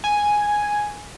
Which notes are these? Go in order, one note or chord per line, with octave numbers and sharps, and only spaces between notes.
G#5